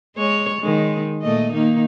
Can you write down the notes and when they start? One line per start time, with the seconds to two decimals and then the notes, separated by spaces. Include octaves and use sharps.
0.16 G#3 C#5
0.61 D#3 G#3
1.22 A#2 A3 D#5
1.53 D#3 A#3 D#4